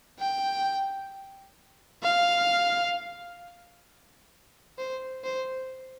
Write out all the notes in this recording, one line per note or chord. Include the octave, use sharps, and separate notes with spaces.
G5
F5
C5
C5